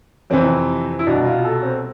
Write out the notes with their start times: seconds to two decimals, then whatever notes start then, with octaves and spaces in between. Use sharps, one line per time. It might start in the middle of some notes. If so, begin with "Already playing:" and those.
0.30 F2 C3 E3 C4
0.99 E4
1.07 C2 B2 D4
1.25 F4
1.45 A4
1.63 C4